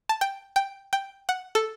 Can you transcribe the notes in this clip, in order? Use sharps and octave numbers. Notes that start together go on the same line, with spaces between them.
A5
G5
G5
G5
F#5
A4